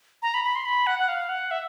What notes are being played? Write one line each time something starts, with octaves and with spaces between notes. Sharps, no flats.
A#5
B5
B5
C6
B5
F#5
F#5
F5
F#5
E5